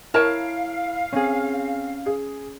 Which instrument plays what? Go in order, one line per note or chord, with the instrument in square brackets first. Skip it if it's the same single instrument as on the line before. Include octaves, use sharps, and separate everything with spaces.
[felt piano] E4 D7 [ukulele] A#4 C#5 A5 [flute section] F5
[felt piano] C4 [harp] C#4 G#4
[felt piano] G#4